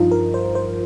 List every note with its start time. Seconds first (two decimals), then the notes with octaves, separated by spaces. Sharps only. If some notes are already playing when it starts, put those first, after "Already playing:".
Already playing: G2 F3 D#4 F4
0.12 A#4
0.34 C5
0.55 C5